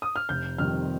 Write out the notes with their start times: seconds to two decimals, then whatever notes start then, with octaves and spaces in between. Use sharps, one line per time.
0.02 D#6
0.16 F6
0.29 F1 G6
0.58 F2 C3 D#3 G3 F6